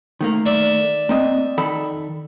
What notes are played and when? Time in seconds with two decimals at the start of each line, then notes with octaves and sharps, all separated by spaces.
0.21 D#3 A3 A#3
0.46 D5 E5
1.09 A#3 C4 D#5
1.58 D#3 A4 B5